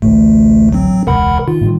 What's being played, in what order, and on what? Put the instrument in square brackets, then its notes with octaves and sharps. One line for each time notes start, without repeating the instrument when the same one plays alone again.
[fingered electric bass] A1 D2 [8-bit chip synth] A3
[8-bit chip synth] F#3 C4
[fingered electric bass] E1 C#2 [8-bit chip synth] A#4 F#5 B5
[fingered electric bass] D#3 [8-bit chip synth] F4
[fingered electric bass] A2 D#3 G3